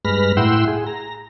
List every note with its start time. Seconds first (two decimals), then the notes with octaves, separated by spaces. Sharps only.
0.05 G2 G#3 B4 B5 F6 A#6
0.37 A2 E4 F#5 G5 C6 E6
0.68 G#4
0.87 A#5